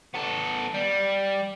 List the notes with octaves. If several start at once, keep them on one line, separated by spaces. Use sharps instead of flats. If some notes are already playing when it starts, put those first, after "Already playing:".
B3 A4
G3